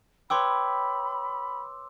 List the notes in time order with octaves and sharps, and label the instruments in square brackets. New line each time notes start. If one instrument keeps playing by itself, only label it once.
[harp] B4 C#5 G5 [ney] B5 [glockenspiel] C6 D6 E6